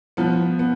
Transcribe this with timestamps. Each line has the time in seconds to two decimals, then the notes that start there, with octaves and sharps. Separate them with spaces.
0.17 F3 B3
0.59 B3